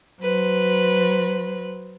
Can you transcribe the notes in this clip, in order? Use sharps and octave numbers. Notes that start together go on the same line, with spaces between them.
F#3 B4 C5